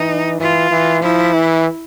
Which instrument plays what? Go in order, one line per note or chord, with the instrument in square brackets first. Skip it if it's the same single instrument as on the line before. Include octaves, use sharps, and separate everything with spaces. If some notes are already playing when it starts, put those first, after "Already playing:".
Already playing: [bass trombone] E3 [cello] D#4
[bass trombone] E3 [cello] F4
[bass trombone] E3
[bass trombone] F3 [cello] E4
[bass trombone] E3